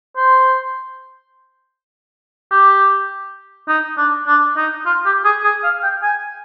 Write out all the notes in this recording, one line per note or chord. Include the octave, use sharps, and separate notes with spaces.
C5
G4
D#4
D4
D4
D#4
F4
G4
G#4
G#4
F5
G5
G#5